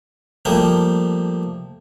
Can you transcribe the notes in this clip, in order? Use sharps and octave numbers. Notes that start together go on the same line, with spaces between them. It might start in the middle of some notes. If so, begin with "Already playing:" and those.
F3 G3 A3 A#3